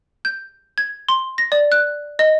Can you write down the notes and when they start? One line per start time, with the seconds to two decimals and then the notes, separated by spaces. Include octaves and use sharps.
0.25 G6
0.78 G#6
1.09 C6
1.38 A#6
1.52 D5
1.72 F#6
2.19 D#5